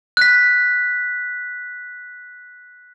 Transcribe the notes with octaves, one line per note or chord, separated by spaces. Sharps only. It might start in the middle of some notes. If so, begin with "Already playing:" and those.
F#6 B6